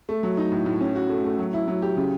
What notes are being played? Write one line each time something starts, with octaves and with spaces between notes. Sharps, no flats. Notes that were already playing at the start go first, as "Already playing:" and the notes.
A3
F#3
D#4
A2
A2
C#4
F#4
A3
A3
F#3
E4
F#3
G4
C#3